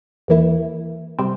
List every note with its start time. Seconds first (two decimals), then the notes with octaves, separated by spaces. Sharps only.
0.28 E2 E3 A#3 E4
1.19 C3 G3 C4